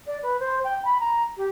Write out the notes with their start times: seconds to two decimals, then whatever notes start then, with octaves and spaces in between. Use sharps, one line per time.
0.07 D5
0.22 B4
0.40 C5
0.64 G5
0.85 B5
1.00 A#5
1.37 G4